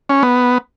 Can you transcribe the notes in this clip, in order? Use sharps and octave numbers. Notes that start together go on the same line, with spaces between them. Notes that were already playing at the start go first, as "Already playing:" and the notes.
C#4
B3